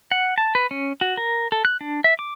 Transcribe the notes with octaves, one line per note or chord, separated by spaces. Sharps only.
F#5
A5
B4
C#4
F#4
A#4
A4
F#6
D4
E5
D6